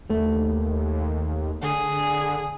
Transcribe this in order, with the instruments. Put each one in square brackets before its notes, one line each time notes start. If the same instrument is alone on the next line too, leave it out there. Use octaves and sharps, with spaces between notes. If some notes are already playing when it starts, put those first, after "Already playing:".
[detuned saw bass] D#2 [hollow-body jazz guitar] A3
[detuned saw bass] D3 [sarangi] G#4